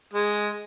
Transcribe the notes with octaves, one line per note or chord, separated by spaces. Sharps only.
G#3